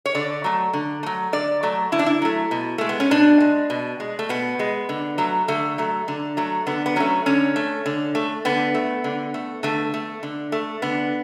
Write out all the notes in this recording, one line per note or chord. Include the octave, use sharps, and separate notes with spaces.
C#5
D3 D5
F#3 A3
D3
F#3 A3
D3 D5
F#3 A3
D3 E4
D4
E4
F#3 A3
B2
G#3 A3
B3
C#4
B2 D4
G#3
B2
G#3
A3
B2 B3
G#3
D3
F#3 A3
D3 A3
F#3 A3
D3
F#3 A3
D3 B3
B3
F#3 A3 C#4
D3 C#4
A3
D3
A3
D3 B3
A3
D3
A3
D3 A3
A3
D3
A3
D3 B3